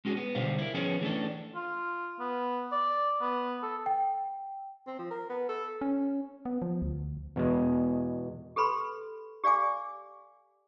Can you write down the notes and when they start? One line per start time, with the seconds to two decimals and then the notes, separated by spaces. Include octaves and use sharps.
0.05 G#3 C#4 F#4 G#4
0.17 B3
0.35 B1 B2 D3 G3 C5 F5
0.59 E4 A#4
0.74 F3 B3 C#4 F4 G#4 C#5
1.01 E3 A3 C#4 D4 A4
1.55 F4
2.20 B3
2.72 D5
3.21 B3
3.63 A4
3.86 G5
4.86 C4
4.98 F3
5.10 A#4
5.29 B3
5.49 A4
5.81 C#4
6.45 B3
6.62 F3
6.82 D2
7.36 E2 B2 G#3
8.56 G4 A4 B4 B5 C6
9.44 G4 D5 F5 G#5 D6